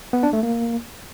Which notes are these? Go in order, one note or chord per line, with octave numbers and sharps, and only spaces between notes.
B3
D4
A3
A#3